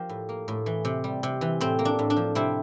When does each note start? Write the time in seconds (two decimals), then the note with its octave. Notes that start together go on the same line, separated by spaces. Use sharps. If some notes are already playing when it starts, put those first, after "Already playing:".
Already playing: F3 G4 A#4
0.09 A2
0.29 A#3
0.48 A2
0.66 E3
0.85 C3
1.04 G3
1.23 C3
1.41 E3
1.61 A2 C4
1.79 A#3
1.85 D4
1.99 A2
2.10 D4
2.16 F3
2.35 C3 C4 E4